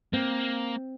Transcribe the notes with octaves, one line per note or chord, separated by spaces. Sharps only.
A#3 C4